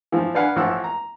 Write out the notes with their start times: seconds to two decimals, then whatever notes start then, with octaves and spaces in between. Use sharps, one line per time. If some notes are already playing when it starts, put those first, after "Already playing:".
0.12 E3 F3
0.34 D4 B4 F5 F#5 G#5 B5
0.56 A1 F3 F#5 E6
0.84 A#5